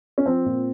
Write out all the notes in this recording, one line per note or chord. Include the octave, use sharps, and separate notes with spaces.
C#4
F3 C4
A#2